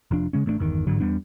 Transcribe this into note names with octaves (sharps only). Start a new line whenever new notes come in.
F1 F3 D4
C#3 G#3 C#4
A1 A3 C4 D4
G1 E2 D#3
A1 G#2 D3 F#3
E2 G3 B3 D4